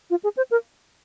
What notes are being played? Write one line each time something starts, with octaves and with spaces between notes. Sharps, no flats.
F4
G#4
C5
A#4